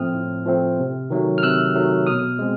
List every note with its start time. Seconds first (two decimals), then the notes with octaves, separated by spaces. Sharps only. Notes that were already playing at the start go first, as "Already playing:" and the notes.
Already playing: A2 F3 A3 C4 D#6 F6
0.14 A2
0.46 F3 A3 C4
0.79 C3
1.10 D#3 F#3 A3
1.38 F6
1.43 C3 E6 F#6
1.74 D#3 F#3 A3
2.07 B2 D#6 F6
2.39 G#3 C4